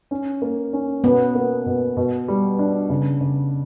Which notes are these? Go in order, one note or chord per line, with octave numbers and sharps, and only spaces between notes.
C#4
A#3
C#4
B2 B3
A#3
B2
B2
G3
D4
C#3
C#3